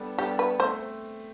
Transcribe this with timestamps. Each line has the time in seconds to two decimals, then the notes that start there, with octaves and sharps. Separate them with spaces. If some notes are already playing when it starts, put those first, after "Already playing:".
Already playing: G3 B3 D4 A4
0.18 G3 B3 D4 G4 A4
0.39 B4
0.60 A3 C4 C5